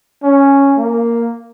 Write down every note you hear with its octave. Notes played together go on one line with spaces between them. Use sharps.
C#4
A#3